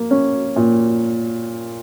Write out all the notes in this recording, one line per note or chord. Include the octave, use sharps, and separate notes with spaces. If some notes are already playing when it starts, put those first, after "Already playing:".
Already playing: A#3
C#4
A#2